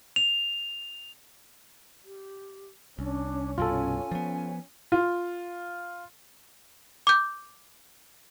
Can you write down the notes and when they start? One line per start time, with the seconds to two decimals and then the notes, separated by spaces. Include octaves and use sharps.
0.16 F7
2.05 G4
2.99 C2 C#4 D4
3.58 C2 G2 B2 F4 A4 G#5
4.11 F3 B3
4.92 F4
7.07 D6 G6